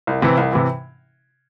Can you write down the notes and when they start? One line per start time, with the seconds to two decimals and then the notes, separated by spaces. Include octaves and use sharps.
0.07 C2
0.22 C3 E3
0.37 C2
0.52 C3 E3